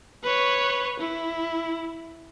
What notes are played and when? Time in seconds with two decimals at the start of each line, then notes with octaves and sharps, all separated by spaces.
0.23 B4 C#5
0.99 E4